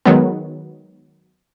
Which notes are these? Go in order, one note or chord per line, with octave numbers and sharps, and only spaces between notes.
D#3 F#3 G#3 B3